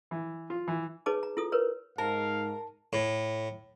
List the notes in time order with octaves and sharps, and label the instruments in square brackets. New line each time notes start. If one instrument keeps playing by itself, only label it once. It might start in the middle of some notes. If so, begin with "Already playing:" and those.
[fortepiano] E3
F4
E3
[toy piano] D#4 G#4 B4 C#5 A5 D6
A#5
E4 F4 A4 D#6
A#4 B4 C#5
[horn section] G#2 [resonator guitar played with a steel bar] A#4 [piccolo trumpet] F5 [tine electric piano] A5
[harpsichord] A2